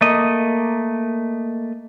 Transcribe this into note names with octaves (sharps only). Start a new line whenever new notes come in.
A3 A#3 D#5